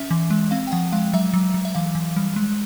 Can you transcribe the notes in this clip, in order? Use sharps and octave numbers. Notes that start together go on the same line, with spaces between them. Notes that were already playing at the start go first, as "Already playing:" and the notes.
Already playing: C#4 E5
E3
G#3
C4 F5
G5
F3 F#5
G#3 F5
F#3 E5
F#3
F#3
E5
E3 F5
E3
G3
G#3